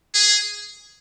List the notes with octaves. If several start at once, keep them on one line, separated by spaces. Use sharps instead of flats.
G#4